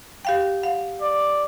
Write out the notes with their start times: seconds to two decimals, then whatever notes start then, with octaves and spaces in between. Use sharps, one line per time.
0.25 G4 F5 G5
0.63 F5 F#5
1.01 D5